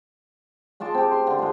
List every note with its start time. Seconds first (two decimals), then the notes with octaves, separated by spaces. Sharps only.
0.80 G#3 F4 A5 D6
0.94 C4 G4
1.11 C6
1.27 D3
1.39 G#3 F4